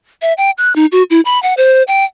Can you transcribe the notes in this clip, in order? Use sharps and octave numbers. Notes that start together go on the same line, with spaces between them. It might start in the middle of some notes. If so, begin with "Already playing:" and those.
E5
G5
F#6
D#4
F#4
E4
B5
F#5
C5
G5